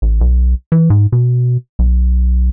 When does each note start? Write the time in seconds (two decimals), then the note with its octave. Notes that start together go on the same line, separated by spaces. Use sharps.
0.02 A1
0.21 B1
0.72 E3
0.90 G#2
1.12 B2
1.79 B1